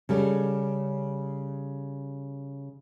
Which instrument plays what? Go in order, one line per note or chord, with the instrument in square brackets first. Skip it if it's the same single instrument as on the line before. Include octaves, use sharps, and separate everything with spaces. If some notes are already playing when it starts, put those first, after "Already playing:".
[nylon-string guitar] C#3 G3 A4